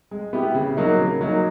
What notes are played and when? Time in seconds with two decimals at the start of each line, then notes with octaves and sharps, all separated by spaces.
0.11 G#3
0.33 B3 E4 G4
0.55 C#3
0.77 F#3 A#3 D#4
0.99 C#3
1.21 F#3 A#3 D#4